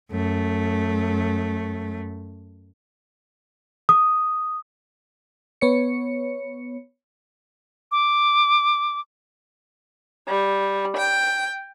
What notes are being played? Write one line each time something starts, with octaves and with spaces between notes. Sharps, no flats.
F#2 A3
D#6
B3 C#5 C#7
D6
G3
G5